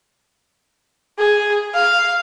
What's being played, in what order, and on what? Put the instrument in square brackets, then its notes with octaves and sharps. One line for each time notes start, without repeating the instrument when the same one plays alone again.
[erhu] G#4
F5